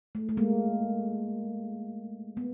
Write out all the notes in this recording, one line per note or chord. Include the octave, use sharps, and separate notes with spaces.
A3
A3
G#3 A#3
B3